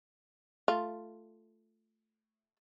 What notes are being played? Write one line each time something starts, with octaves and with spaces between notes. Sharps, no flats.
A3 F4